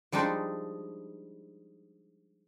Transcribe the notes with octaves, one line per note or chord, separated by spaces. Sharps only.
F3 G3 G#3 D4 D#4